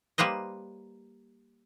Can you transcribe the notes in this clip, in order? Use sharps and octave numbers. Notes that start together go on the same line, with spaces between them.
G3 A#3 B4 C5 D#5